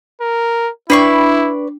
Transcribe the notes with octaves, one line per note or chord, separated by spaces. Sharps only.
A#4
D4 E4 B4 D5 C#6 C7